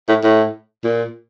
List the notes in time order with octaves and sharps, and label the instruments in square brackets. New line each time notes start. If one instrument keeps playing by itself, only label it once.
[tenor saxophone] A2
A2
A#2